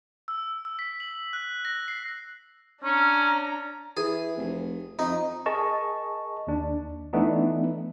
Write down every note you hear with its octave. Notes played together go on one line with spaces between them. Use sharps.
E6
E6
B6
F#7
F#6
A#6
C7
C#4 D4 A#5
E3 G#4
F1
F2 D#4
G#4 A#4 D#5 A5 C#6
D#2 D4
E3 A3 B3 D4 D#4